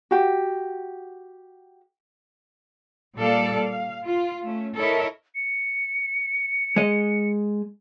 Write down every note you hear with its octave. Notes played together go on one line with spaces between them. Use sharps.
F#4 G4
A#2 G3 A#3 A4 D5 F5
F5
F4
A3 C#4
E4 A4 A#4 C#5 D#5 E5
C#7
G#3 D#5